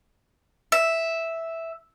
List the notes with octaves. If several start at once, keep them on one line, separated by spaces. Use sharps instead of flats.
E5